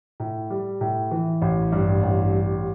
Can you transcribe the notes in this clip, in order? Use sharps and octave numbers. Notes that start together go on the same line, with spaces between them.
A2
G3
A2
E3
A1
G2
A1
G3